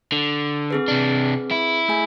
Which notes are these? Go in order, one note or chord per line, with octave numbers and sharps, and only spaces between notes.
D3
C4 G#4 B4
C3 D4
E4
A3 G#4 G#5